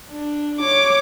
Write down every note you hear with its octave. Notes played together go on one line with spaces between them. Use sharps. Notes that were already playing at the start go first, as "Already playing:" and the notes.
D4
C#5 D6